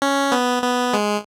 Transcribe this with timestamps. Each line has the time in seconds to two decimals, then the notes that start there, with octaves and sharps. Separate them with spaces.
0.02 C#4
0.32 B3
0.63 B3
0.94 G#3